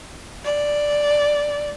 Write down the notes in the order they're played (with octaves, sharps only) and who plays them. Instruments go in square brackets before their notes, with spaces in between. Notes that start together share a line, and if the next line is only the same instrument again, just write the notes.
[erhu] D5